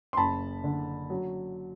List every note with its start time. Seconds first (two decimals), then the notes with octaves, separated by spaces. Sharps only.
0.13 C6
0.17 F#1 A5 B5
0.64 D3
1.10 F#3